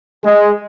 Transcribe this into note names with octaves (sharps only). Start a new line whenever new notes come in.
G#3